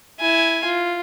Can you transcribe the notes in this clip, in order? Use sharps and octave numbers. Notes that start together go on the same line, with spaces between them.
E4 G#5
F4